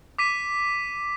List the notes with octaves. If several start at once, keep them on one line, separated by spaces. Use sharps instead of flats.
D6 B6 D#7